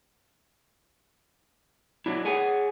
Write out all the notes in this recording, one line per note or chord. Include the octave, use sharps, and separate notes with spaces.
F#3 D4 E4
G#4 C#5 F#5 G#5